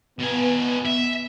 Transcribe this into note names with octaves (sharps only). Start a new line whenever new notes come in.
B2 B3 G#5
E5